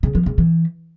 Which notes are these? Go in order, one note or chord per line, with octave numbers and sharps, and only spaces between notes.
C#3
F3
C#3
E3